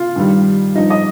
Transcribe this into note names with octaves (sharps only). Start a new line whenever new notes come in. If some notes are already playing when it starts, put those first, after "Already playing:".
Already playing: F4
G2 D#3 G3
G2 F3 D#4
D#5